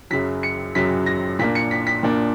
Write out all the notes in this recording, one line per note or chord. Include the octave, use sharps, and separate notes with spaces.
F#2 C#3 F#3 B6
C#7
F#2 C#3 F#3 B6
A#6
A#2 A#3 D4 B6
C#7
B6
B6
A#2 A#3 D4